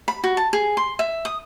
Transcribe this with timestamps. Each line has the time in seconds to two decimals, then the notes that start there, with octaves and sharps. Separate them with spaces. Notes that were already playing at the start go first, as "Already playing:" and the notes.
0.08 B5
0.24 F#4
0.37 A5
0.53 G#4
0.77 C6
0.99 E5
1.25 D#6